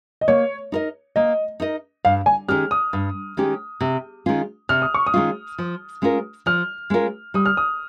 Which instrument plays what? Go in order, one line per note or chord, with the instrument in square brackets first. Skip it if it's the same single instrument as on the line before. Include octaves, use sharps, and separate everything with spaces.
[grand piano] D#5
[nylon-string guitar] A#3 [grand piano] C#5
[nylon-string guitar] D#4 A#4 D#5
[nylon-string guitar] A#3 [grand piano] D#5
[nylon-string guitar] D#4 A#4 D#5
[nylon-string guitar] G2 [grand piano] F5
[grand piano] G#5
[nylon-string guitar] D#3 G#3 C#4 G4 [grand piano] F6
[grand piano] D#6
[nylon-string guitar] G2
D#3 G#3 C#4 G4
C3
D#3 G#3 C#4 F4
[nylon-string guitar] C3 [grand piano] F6
[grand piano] D#6
C#6
D#6
[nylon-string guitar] D#3 G#3 C#4 F4
F3
G#3 C#4 F4 A#4
[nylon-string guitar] F3 [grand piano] F6
[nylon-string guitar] G#3 C#4 F4 A#4
[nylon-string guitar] G3 [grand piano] D#6
[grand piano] F6
D#6